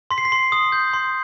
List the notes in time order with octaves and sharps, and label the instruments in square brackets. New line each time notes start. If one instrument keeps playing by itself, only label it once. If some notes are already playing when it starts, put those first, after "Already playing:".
[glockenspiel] C6 B6
C7
B6
C6
D#6
G6
C6